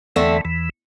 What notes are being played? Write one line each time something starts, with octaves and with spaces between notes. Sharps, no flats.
E2 D3 E3 A3 C4
E2 E3